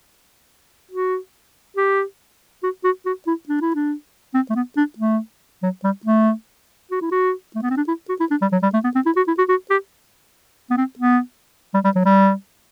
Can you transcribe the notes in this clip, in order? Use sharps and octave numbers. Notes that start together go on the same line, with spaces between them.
F#4
G4
F#4
F#4
F#4
E4
D4
E4
D4
C4
A3
B3
D4
A3
F#3
G3
A3
F#4
E4
F#4
A3
B3
C4
D4
E4
F#4
E4
D4
G3
F#3
G3
A3
B3
C4
E4
F#4
E4
F#4
F#4
G4
B3
C4
B3
G3
G3
F#3
G3